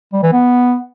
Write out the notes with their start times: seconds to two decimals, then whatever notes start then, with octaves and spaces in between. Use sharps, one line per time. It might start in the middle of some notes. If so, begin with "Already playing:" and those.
0.13 G3
0.23 E3
0.33 B3